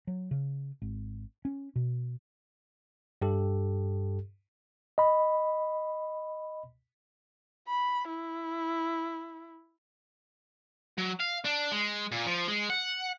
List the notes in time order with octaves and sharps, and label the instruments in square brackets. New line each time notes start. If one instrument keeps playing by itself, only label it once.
[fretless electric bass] F#3
C#3
G#1
C#4
B2
[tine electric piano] G2 G4 A4
D#5 B5
[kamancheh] B5
E4
[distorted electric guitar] F#3
F5
D4
G#3
A#2
F3
G#3
F#5